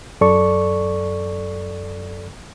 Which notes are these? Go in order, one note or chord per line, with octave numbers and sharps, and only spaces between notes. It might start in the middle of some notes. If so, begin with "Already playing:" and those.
F#2 A4 D5 C#6